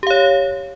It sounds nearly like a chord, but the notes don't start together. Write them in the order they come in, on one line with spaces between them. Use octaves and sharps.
G4 F5 C#5